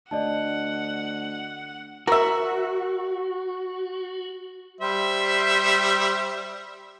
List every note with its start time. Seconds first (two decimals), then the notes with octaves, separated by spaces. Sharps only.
0.11 D2 D5 D#5 F#5 A5
2.07 F#4 A#4 E5
4.81 G3 C5 E5